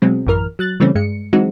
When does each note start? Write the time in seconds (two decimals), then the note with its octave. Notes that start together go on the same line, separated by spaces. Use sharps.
0.02 B2 F#3 G#3 C4
0.27 A1 F#2 E3 A#4 F6
0.59 F#3 F#6 A6
0.80 C#3 E3 G3 A3 C4 C#4
0.95 G2 G#3 C#7
1.33 E3 F#3 G#3 C4 D#4 F#4